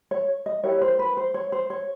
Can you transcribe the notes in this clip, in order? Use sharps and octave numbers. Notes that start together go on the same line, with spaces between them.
C#5
D#5
E4 G4 A#4 C#5
C5
B4
C5
C#5
C5
C#5